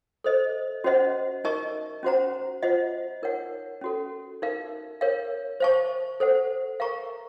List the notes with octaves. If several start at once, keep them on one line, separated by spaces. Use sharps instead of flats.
A4 C5 D#5
C#4 F#4 C5 D#5 F#5
D#4 A#4 D#5 A5 C#6
C#4 F#4 C5 F#5 A#5
F4 C5 D#5 F#5
D#4 A#4 C#5 F#5
C#4 F#4 A4
D#4 A#4 F5
A#4 C#5 F5
C5 F5 A5 C#6
A4 C5 F#5
A#4 F5 A#5 C#6